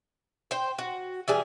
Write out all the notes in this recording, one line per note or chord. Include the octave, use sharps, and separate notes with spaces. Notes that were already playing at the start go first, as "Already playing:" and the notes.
C5 G5
F#4
E3 G3 G#4